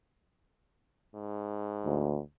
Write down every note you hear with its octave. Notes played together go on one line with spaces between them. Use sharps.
G#2
D2